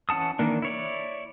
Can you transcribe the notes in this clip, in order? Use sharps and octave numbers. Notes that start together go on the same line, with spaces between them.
E3 C#4 F#5 A5 D#6
D#3 E3 A#3 D4
E4 C#5 D5